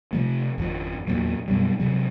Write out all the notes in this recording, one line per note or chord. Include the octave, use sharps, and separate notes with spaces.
C3 F3 A3
G#1 F2 F3
E2 A#2 F#3
F#2 B2 G3
C3 F#3 G#3